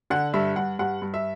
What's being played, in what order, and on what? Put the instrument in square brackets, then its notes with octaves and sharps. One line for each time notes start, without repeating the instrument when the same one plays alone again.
[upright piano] D3 F#5
G2 E5
G2 F#5
G2 F#5
G2
E5